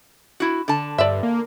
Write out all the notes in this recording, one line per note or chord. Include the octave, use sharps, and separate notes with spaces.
E4 F#4
D3 A5
G2 D5 E5
A#3